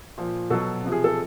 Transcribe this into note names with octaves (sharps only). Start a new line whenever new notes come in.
A#2 F3
B2 F#3 A4
C3 F3
G#4
A4